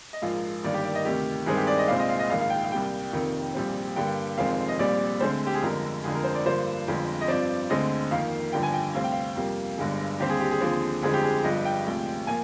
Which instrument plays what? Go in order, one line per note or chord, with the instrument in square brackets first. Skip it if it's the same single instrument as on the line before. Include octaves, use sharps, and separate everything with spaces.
[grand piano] D#5
A#1 G#2 F3 A#3 F5
G1 G2 D#3 A#3 D5
G4
D5
D#5
D2 C3 D#3 G4
G2 D#3 G#3 C4 G#4
G4
D5
D#5
C2 A#2 G#3 C4 F5
D#5
F5
D#5
A#1 G#2 D#3 A#3 F5
F5
G5
F5
C2 C3 G3 A#3 G5
F1 F2 C3 D#3 A#3
A#1 A#2 G3 C4
G2 D3 G3 A#3 G5
F1 F2 D#3 G#3 C4 F5
D#5
A#1 A#2 G3 C4 D5
D2 D3 G#3 C4 C5
G4
G#4
G1 F2 D3 G#3 A#4
G1 F2 D3 G#3 G#4
A#4
C5
D5
G2 D3 F3 A#3 C5
G1 F2 D3 G#3 C4
D#5
G2 F3 C4 D5
D2 D3 G#3 C4 D#5
F2 D#3 A#3 F5
G1 G2 D3 F3 G5
G#5
G5
D2 C3 G3 C4 F5
G5
F5
F2 C3 G3 A#3
G1 G2 D3 G#3
D#2 D3 G3 C4 G4
G#4
G4
G#4
D#2 D3 F3 C4
G1 F2 D3 G#3 C4 G#4
G4
G#4
G1 G2 F3 D#5
G5
D2 C3 F3 G#3
A#2 F3 A#3 G#5